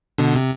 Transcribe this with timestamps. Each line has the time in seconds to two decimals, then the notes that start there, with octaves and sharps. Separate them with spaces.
0.18 B2 D3
0.35 C3